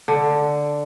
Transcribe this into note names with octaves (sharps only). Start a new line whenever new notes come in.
D3